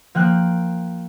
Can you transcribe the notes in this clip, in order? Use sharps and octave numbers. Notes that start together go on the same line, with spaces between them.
F3 A#3 G5 F#6